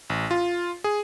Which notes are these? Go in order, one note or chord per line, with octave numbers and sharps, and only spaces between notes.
A1
F4
G#4